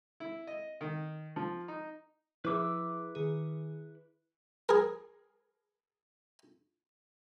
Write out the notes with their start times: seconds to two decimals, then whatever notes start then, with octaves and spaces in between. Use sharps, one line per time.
0.20 E4
0.47 D#5
0.81 D#3
1.36 F3
1.68 D#4
2.45 F3 E4 G#4 B4 D6 E6
3.15 D#3 G#4
4.69 G#4 A#4